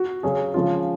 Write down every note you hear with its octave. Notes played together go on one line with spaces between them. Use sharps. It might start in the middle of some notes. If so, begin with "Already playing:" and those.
Already playing: F#4
C#3 F#3 C#4 G#4
C#3 F3 G#3 C#4 F4